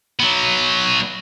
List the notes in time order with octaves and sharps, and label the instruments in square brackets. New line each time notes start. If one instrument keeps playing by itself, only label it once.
[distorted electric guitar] F#3 B3